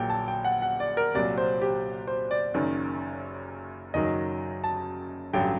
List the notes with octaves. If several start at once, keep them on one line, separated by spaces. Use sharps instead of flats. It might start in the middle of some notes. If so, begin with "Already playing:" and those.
Already playing: A#1 A#2 F#3 G5
A5
G5
F#5
F#5
D5
A#4
C2 A#2 F#3 D5
C5
G4
C5
D5
F#1 F#2 D#3
F#1 F#2 D#3 F#3 D#5
A5
A1 G2 D3 F#3 G5